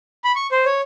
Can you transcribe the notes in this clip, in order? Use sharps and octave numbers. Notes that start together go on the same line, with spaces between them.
B5
C#6
C5
C#5